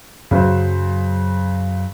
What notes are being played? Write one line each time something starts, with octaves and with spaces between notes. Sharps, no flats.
F#2 C#3 F#3 C#4 C5